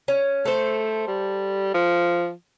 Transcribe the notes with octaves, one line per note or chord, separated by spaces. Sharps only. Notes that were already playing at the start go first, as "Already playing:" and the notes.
C#4
A3 A4 C5
G3
F3